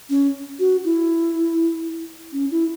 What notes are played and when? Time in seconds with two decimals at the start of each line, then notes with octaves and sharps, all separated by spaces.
0.10 C#4
0.59 F#4
0.85 E4
2.33 C#4
2.51 E4